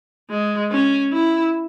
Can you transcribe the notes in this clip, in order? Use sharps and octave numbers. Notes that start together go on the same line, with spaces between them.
G#3
C#4
E4